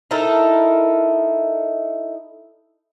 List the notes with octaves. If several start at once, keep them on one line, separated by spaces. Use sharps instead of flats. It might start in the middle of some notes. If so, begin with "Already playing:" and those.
D#4 E4 A4 A#4